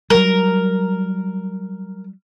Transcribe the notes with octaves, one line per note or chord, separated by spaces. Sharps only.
F#3 G3 A#4